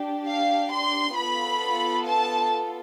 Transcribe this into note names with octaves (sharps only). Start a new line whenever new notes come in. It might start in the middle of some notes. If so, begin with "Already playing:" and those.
Already playing: D4 G4
F5
C6
B3 F4 A4 B5
A5